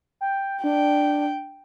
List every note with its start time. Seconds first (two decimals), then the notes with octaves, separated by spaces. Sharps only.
0.21 G5
0.64 D4 G5